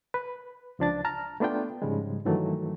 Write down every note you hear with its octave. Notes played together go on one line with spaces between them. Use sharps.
B4
C#2 F3 D4 A6
A5 A#5 F6
A3 B3 D4 F4 G5
G#2 C#3 F3 G3 G#3
G2 D#3 E3 F#3 A3